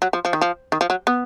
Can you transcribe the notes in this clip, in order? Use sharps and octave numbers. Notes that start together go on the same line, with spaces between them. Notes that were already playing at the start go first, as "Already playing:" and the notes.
F#3
F3
F3
D#3
F3
D#3
F3
F#3
B3